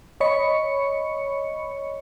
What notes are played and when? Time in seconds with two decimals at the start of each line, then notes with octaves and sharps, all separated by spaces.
0.20 C#5 D#5 B5 C#6 C#7